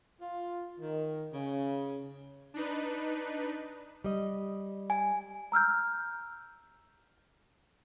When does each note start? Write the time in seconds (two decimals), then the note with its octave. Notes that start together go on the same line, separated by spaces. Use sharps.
0.21 F4
0.79 D#3
1.33 C#3
2.54 D4 D#4 B4
4.04 G3 D#5
4.90 G#5
5.52 A#5 E6 F6 G6